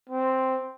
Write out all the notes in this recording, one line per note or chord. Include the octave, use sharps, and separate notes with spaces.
C4